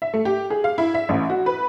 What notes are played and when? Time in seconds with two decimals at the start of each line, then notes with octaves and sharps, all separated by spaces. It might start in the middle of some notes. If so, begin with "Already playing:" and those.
0.02 E5
0.14 A3
0.25 G4
0.50 G#4
0.64 F5
0.78 E4
0.94 E5
1.09 A1
1.30 F#4
1.46 B4